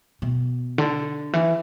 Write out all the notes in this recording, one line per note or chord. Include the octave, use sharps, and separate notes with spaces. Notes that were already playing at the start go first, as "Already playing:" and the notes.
B2
D3
E3